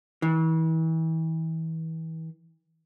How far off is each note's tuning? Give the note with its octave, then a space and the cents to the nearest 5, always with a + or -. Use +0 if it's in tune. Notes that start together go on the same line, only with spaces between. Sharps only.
E3 -35